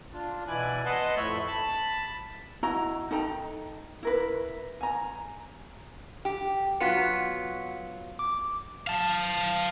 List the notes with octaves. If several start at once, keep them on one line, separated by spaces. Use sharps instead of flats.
D4 F4
B2 E3 E4 D5 G#5 F#6
B4 D#5 F#5 A5 C6
F2 A2 A3 C#5 E5 B5
A5 B5
E4 F#4 D#5 A#5
D#4 A4 G5 A#5
E4 A#4 B4
G#5 A#5
G4
F#3 B3 F4 F#4 B6 C#7
D6
F5 A5